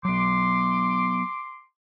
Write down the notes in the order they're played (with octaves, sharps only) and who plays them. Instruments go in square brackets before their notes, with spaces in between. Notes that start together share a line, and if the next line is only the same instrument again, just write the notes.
[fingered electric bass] F#3 B3 [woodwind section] C6 D6